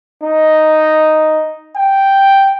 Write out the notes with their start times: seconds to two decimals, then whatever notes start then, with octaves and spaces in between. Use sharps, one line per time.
0.23 D#4
1.76 G5